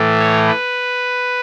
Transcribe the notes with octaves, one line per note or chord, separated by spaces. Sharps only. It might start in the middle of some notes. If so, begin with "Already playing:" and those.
Already playing: A2 E3 A3
C#5
B4